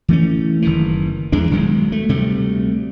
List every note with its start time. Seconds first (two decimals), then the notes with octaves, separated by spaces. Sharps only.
0.09 E3 A3 C#4
0.62 F#1 D#3 E3
1.32 E2 E3 G#3 D4
1.51 B1 D#3 F#3 G#3
1.92 A3
2.09 D2 C3 G3 A3